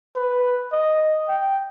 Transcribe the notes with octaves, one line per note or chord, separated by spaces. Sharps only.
B4
D#5
G5